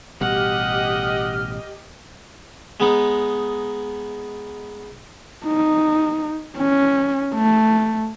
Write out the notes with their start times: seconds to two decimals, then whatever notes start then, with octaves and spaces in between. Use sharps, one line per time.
0.21 A1 B2 G3 G4 D#5 F#5 F6
2.80 G#3 B3 D#4
5.46 D#4
6.57 C#4
7.34 A3